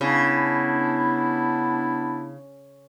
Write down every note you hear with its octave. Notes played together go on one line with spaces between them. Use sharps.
C#3 B3 D4 E4